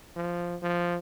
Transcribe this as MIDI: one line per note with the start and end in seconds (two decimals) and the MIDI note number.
0.16 0.56 53
0.62 0.98 53